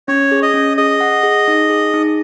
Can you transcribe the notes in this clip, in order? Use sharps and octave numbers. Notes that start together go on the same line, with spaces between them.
C#4 C#5
G#4
D#5
C#4
G#4 D#5
F#5
G#4
D#4
G#4
D#4